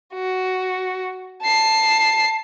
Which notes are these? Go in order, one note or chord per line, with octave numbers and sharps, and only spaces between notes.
F#4
A5 C7